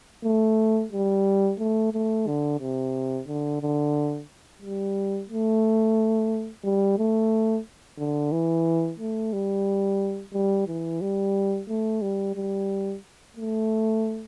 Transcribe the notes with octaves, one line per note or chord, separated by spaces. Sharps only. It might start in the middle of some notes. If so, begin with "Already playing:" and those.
A3
G3
A3
A3
D3
C3
D3
D3
G3
A3
G3
A3
D3
E3
A3
G3
G3
E3
G3
A3
G3
G3
A3